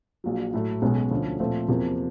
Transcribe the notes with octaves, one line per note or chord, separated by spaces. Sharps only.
A#1 A#2 F#3
A2 F#3 A3
B1 B2 G#3 C#4
D2 D3 F3 A3 C#4
A#2 F3 A3 C4
E2 C3 F3 A#3